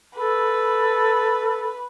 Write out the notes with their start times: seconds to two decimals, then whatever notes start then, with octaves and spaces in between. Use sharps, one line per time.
0.17 A4 B4